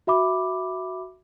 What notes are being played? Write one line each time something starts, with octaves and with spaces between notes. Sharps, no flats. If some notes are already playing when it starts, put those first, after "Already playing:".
F#4 E5 B5 D6